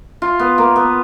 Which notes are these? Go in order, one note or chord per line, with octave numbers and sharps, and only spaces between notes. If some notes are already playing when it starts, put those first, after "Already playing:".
F4
B3
A#3
B3